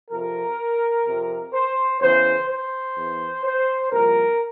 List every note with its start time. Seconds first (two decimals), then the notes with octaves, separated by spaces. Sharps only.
0.10 F2 C3 F3 A#4
1.06 F2 C3 F3
1.53 C5
2.01 E2 C#3 E3 C5
2.48 C5
2.96 E2 E3
3.44 C5
3.91 C2 A#2 F3 A#4